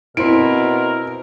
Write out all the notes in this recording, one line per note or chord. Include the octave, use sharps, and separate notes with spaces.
B2 C4 E4 A#4 D7